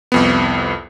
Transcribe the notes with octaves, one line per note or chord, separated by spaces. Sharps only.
C2 F2 B3